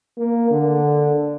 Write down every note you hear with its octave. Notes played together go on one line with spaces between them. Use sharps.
A#3
D3